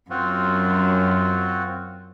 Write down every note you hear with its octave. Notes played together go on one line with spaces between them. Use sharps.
F#2 C4 F4 F#4